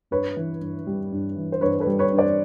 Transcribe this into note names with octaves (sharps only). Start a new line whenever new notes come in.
G2 B4 C#5
E3
G2
G3
G2
E3
C5
G2 B4 C#5
A4 B4
G3
B4 C#5
G2
C5 D5